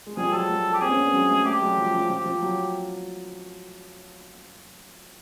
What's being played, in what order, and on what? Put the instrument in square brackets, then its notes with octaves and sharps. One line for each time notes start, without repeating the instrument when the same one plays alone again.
[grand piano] G#3
[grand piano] F3 G3 [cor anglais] G#4
[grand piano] F#3 G#3 [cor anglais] A4
[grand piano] F#3 G#3
[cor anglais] G4
[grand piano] A#3 C4 [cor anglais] G#4
[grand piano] B3 C#4
C4 D4
B3 C#4
F#3 G#3
G3 A3
[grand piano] G3 A3 [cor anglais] G4
[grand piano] F#3 G#3
F3 G3
F3
[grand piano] F3 [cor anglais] G4
[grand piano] F3
F#3